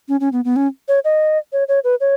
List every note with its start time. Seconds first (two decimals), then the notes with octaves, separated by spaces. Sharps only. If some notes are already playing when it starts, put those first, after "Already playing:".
0.08 C#4
0.20 C#4
0.33 B3
0.45 B3
0.56 C#4
0.88 C#5
1.04 D#5
1.53 C#5
1.68 C#5
1.84 B4
2.00 C#5